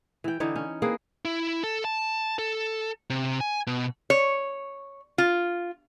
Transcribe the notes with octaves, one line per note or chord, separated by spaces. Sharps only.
E3 G5
D3 E3 D#4 C#5
C#4
A#3 C4 G#4 B4
E4
A4
A5
A4
C3
G#5
B2
C#5
F4